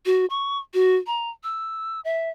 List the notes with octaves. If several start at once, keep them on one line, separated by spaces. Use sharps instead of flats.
F#4
C#6
F#4
A#5
E6
E5